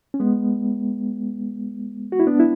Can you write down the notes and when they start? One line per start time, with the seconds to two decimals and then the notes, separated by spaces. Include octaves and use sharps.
0.14 C#4
0.20 G#3 B3
2.12 F#4
2.20 E4
2.27 B3 D4
2.40 E4